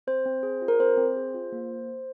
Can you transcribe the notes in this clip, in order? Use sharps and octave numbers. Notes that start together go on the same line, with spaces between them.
C4 C5
C4
G#4
F4
A#4
C4 C5
C4
G#4
F4
A#3